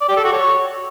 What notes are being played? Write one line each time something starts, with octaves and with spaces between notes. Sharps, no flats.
D5
G4
A4
F#4
C#5